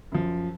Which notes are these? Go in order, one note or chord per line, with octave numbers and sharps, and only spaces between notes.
F#2 F3